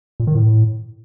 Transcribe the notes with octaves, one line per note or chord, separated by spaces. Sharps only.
A#2
D#3
A2